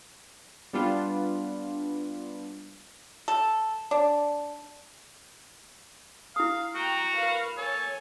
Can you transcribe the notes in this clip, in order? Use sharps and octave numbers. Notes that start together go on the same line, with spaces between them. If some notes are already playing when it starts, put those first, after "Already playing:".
G3 B3 D4 F4
A4
D4
E4 F5 D#6
F#4 G5 A#5
A#4 B4 F5
A4 C#5 G#5